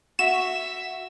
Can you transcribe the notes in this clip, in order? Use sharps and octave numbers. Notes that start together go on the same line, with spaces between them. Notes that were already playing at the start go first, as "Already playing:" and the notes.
F#4 E5 E7